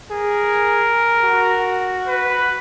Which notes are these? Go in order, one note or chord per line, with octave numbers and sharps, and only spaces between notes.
G#4 A#4
F#4
B4